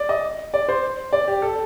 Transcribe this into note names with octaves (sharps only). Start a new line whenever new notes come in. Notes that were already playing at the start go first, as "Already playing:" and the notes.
Already playing: D5
D#5
D5
C5
D5
G4
A4